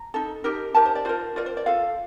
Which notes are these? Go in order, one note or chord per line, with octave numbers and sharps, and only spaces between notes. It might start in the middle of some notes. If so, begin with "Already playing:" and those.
Already playing: A#5
D#4 A4
D#4 G4 A#4
D#4 G4 A#4 A5
C5
D5
F4 A#4 C5
F4 A#4 D5
C5
D5
F4 A4 F5